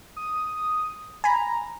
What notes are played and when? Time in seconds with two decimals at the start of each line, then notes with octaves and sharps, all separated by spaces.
0.16 D#6
1.24 G#5 A#5 B5